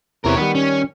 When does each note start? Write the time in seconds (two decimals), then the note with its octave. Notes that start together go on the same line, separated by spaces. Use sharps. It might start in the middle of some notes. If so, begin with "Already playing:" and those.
0.25 E2 C3 E3 A#4 C#5
0.37 D#3 G3 B3
0.56 C#4